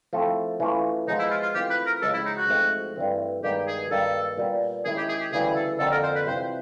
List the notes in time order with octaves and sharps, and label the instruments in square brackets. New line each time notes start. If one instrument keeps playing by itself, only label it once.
[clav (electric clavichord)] F3 A3 C4 E4 A4
E3 A3 C#4 F4
[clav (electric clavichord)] F3 G#3 B3 [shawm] D#4
[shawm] E4
F4
F4
[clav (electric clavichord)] E3 A3 C4 F4 [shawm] G4
[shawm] B4
A#4
[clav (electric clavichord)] C#2 C#3 F3 G#3 C#4 [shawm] A4
[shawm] E4
D#4
F#4
[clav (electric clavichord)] G#2 F3 A3 C4
G2 E3 A3 C4
[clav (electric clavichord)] G2 D#3 G#3 B3 D#4 [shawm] G4
[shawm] G#4
[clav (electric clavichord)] G2 D#3 F#3 A#3 [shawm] A4
[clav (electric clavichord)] A#2 G3 B3
[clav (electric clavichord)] D#3 G#3 C#4 E4 [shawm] G#4
[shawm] G4
G#4
G4
[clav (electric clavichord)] D2 C#3 E3 G3 [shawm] G#4
[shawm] A4
[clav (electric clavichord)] F2 D3 F3 A#3 D4 [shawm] A4
[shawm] A#4
C5
B4
[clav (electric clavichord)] C3 E3 G3 C4 F4 [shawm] C5